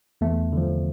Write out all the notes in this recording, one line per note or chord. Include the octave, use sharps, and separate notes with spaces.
E2 A3
D3 F3